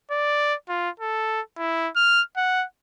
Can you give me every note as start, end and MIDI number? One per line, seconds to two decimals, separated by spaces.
0.11 0.54 74
0.69 0.90 65
1.00 1.41 69
1.58 1.89 64
1.96 2.22 89
2.37 2.65 78